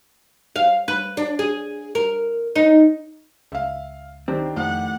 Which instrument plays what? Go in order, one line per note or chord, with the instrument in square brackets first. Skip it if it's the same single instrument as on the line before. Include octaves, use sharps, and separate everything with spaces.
[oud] F5
B4
D4
G#4
A#4
D#4
[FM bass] C#2 [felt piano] E5 F5
[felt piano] D#3 D4 G4 [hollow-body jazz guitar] C4
[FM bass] F2 [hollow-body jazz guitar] A2 [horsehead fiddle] F#5